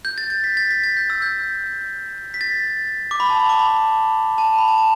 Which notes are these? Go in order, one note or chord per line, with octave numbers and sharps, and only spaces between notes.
G6
A6
A6
B6
A6
B6
A6
G6
E6
G6
B6
A6
D6
B5
A5
B5
D6
B5
A5
B5
A5
A5